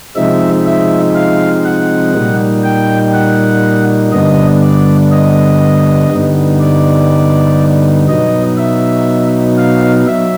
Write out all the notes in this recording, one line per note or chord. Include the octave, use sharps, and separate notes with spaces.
C3 F3 G#3 C4 D#4 E5
E5
F5
F#5
A#2 G3 A#3 D#4
G5
F#5
G2 D3 G3 B3 D4 D#5
D5
D#5
G2 D3 G3 B3 D#4
D5
B2 F#3 B3 D#4 D#5
E5
F5
F#3 E5